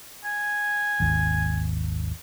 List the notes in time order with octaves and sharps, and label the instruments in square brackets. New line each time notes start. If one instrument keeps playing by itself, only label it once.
[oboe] G#5
[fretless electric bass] G#1 D#2